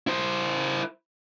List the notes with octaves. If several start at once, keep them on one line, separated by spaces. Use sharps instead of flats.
E4 C5